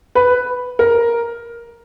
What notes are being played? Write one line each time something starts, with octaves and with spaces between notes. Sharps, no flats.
B4
A#4